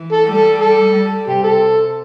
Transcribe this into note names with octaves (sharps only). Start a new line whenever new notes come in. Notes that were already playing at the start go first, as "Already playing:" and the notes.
Already playing: E3
A4
G3
A4
A4
G3
C3 G4
A4